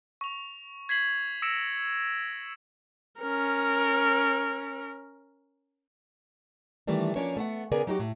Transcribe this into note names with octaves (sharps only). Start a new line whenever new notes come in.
C#6 F7
G#6 B6 C7 F#7
D#6 E6 A#6 C#7 D7 E7
C#4 A#4
D#3 E3 G3 A3 D4
F3 A#3 C#4 D4 C#5
A3 B3 F#5
C#3 B3 G#4 A#4 D5 G#5
F#3 D#4 F#4 G4
A2